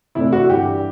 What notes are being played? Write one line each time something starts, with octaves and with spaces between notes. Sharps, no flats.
C3 E3 A3 D4 E4
F#4
G2 E3 G3 D4 G4